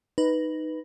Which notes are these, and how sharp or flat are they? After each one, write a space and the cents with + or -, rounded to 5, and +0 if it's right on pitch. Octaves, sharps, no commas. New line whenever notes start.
D#4 +0 B4 +0